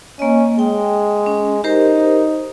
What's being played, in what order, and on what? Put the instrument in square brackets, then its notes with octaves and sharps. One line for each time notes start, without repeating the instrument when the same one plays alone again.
[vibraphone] A#3 D#5 [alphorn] C#4
[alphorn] G#3 [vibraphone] G5
[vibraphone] C#4
[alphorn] D#4 [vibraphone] G4 A#4 C5